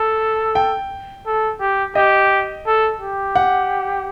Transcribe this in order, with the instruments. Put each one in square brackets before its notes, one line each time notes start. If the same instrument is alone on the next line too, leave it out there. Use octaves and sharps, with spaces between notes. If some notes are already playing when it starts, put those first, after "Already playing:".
Already playing: [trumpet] A4
[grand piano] G5
[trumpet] A4
G4
[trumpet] G4 [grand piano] D#5
[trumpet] A4
G4
[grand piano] F#5